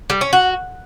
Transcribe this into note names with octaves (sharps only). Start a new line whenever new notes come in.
G3
C#4
F#4